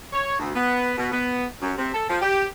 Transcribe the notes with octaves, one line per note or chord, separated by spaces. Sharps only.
C#5
D2
B3
B2
B3
F#2
C3
A4
F3
G4